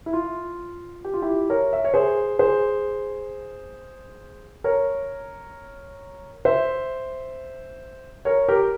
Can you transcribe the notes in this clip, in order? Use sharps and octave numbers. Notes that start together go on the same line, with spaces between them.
E4
F4
G4
F4
E4 G4
A#4 C#5
E5
C#5
G#4 C5
G#4 C5
A#4 C#5
C5 E5
A#4 C#5
G4 A#4